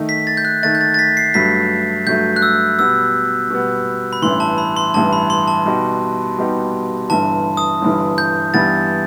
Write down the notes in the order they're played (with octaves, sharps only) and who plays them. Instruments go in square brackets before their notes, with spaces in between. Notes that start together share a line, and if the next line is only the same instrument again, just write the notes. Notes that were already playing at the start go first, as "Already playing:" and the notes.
Already playing: [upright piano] D#3 A3 D#4
[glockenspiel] B6
A6
G6
F#6
[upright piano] D#3 A3 D#4 [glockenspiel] A6
[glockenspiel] G6
A6
A6
B6
C7
[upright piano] G2 F#3 A3 [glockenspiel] B6
[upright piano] G2 F#3 A3 [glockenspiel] G6
[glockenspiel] F#6
E6
[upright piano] B2 G3 B3 [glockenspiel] E6
[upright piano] B2 G3 B3
[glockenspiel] B5
[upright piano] A1 G2 E3 [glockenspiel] C6
[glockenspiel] A5
B5
C6
[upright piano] A1 G2 E3 [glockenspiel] A5
[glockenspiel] B5
C6
A5
[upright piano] B2 G3 B3 D#4 G4
B2 G3 B3 D#4 G4
[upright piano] G1 G2 E3 [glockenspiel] A5
[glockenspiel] D#6
[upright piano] G1 G2 E3
[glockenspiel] G6
[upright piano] G2 E3 G3 B3 [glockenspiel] A6